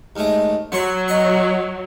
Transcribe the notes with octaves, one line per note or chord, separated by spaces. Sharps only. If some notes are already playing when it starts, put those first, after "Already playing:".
D#2 G#3 A3
F#3 F#5 C6 C#6
D#5 C#6